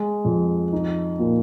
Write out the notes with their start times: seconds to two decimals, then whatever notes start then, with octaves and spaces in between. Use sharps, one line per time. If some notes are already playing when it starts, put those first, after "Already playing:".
Already playing: G#3
0.25 F2
0.72 D#4
1.19 A#2